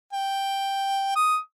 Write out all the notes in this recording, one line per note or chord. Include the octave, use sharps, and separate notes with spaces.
G5
D#6